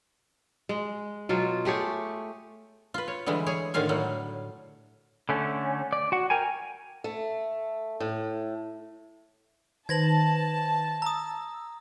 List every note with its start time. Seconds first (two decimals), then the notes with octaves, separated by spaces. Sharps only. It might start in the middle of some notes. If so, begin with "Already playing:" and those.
0.69 G#3
1.29 B2 F#3 F4
1.65 A3 G4 G#4 C#5
2.94 F4 B4
3.08 C#5
3.26 D3 E3 G3 G#3
3.47 G#4 C#5
3.74 A2 D3 D#3 F4 F5 G#5
3.89 A2 F#3 G3
5.29 D3 A3 C#4
5.93 D5
6.12 F#4 F#5
6.30 A#4 G5 G#5
7.04 A3
8.00 A2
9.89 D#3 B4 C5 A5 G#6 A#6 F#7
11.02 A#5 D#6 E6